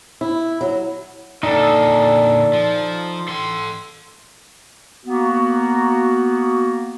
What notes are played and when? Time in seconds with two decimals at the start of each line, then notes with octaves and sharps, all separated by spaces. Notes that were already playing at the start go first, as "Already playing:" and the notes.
0.21 E4
0.61 F#3
1.43 A#2 D3 D#4 A4 D5
2.53 F3
3.28 A4 C6
5.06 A#3 B3 F#4